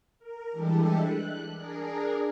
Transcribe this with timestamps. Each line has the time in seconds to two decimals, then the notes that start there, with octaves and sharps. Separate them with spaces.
0.19 A#4
0.51 E3 G3 G#3 D4 G4 A4
0.98 F#6
1.52 D4 G#4 A#4